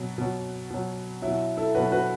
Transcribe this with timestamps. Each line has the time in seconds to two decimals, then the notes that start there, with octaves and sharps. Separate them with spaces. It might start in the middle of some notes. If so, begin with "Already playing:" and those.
Already playing: B2 F#3
0.18 B2 F#3
0.70 B2 F#3
1.22 B2 F#3 E4
1.57 E4 A4
1.75 B2 F#3 F#4 B4
1.92 F#4 B4